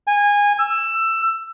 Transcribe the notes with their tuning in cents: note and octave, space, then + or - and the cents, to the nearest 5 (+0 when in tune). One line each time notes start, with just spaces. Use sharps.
G#5 -20
E6 +15